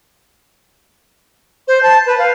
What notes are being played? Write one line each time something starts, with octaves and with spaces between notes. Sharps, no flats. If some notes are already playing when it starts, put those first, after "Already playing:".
C5
A5
B4
F5